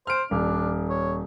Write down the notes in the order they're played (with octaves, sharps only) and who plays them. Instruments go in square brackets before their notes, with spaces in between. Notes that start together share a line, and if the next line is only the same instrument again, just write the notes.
[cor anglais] C5 [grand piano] F6 D7
[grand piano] D#1 [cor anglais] D4
[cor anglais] C#5